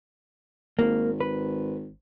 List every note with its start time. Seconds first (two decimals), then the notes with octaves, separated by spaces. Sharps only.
0.79 G#1 A#3
1.20 B4